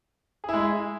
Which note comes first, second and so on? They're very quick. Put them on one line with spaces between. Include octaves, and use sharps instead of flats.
G#4 E4 G#3